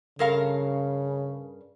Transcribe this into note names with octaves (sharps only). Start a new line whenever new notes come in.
G2 C#3 A#4 F5